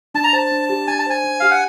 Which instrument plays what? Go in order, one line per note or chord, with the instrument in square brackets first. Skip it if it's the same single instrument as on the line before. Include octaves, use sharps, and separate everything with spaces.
[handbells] D4 [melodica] A5
[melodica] A#5
[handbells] C5 [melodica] A5
[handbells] D4
G4
[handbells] D4 [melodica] G#5
[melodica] A5
[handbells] C5 [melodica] G#5
[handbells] D4
[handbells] G4 [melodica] F5
[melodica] F#5